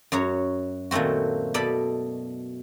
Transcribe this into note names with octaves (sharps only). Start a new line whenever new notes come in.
F#2 F#4 C#5 A#5
A#2 D#3 A3 C4 F#4
B2 A4 D5 D#5 B5